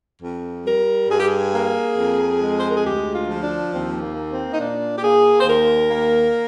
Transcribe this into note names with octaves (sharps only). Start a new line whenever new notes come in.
F2
G3 A#4
G2 G#4
G4
G#4
A#3
F2
G#3
C5
A#4
G#4
D2 G4
F4
F3
D4
D#2 C4
A#3
A#3
C4
D#4
A#2 D4
G4
A#3 G#4
C5
D#2 A#4
A#3